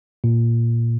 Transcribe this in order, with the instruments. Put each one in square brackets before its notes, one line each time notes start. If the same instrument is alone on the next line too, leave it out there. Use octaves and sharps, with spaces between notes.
[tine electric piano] A#2